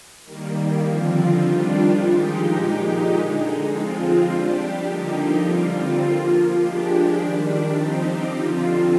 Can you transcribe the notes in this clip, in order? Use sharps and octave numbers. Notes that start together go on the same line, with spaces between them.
D#3 G3 A#3
D3 F3 C4 F4
D#3 G3 D4 F4
F3 G#3 D#4 G4
A#2 G#3 D#4 G4
D3 G#3 D#4
F3 G#3 C4 F4
G3 D4 G4
D3 F3 A#3 D#4 G4
D3 G3 C4 F4
F3 A#3 F4
F3 G#3 D4 G4
D#3 G3 D4
F3 C4 D#4 G4
D3 F3 C4 F4